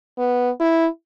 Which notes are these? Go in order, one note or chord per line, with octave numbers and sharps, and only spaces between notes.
B3
E4